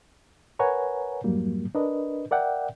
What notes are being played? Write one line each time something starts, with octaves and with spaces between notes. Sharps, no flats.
A#4 B4 C#5 F#5 G#5 A#5
F2 G#2 F#3 G3 A#3
D4 A#4 B4 D#5
A#4 D5 E5 F#5 G5